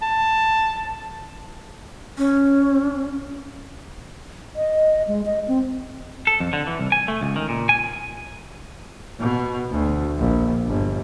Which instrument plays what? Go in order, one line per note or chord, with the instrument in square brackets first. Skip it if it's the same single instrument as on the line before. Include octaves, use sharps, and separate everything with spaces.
[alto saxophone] A5
[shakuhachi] C#4
[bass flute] D#5
G#3
D#5
C4
[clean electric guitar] A4
F2
D3
E3
C2
G#5
A3
C#2
D#3
A#2
G#5
[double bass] B2
D2
A#1
G1